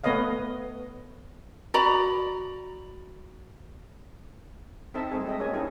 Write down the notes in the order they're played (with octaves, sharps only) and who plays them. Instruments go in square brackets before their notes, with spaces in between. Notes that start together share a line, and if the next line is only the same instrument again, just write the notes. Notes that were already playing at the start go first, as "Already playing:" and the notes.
[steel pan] A3 B3 B4 C#5 D#5 F5
[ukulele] F#4 D5 A#5 B5
[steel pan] C4 D#4 A4 D#5 E5 A5
G3 A3 C4 G#4
G#3 G4 D#5 E5
G#3 A#3 C#4 G#5
C#4 D#4 E4 G4 A4 D#5